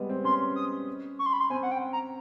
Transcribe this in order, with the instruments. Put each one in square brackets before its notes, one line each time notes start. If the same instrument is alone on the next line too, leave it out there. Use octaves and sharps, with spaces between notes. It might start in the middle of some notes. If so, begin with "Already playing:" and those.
Already playing: [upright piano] G3 G#3 B3
C4
[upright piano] C#4 [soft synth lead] C6
[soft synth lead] D#6
C#6
C6
B5
C6
[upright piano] C4 [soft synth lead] G#5
[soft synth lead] F#5
G5
A#5